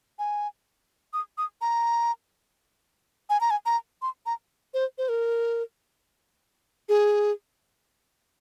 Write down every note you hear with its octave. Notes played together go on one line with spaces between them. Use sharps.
G#5
D#6
D#6
A#5
G#5
A#5
G#5
A#5
C6
A#5
C5
C5
A#4
G#4